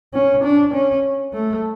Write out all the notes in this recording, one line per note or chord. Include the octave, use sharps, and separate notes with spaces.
C#4
D4
C#4
A3